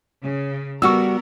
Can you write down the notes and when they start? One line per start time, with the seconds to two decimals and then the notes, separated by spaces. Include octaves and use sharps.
0.23 C#3
0.82 G3 B3 F#4 A#4 C#6 E6